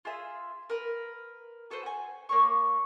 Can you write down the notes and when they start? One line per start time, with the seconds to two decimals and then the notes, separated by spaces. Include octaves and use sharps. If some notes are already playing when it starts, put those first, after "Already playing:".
0.05 F4 G#4 E5
0.70 A#4 B4
1.70 F#4 A4 B4 C5
1.83 F#5 G#5
2.29 A#3 C#5 C#6